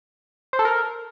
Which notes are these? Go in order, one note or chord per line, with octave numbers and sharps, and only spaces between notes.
C5
A4
A#4